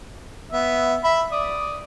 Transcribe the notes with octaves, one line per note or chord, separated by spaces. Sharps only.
B3 E5
E5 B5
D5 D#6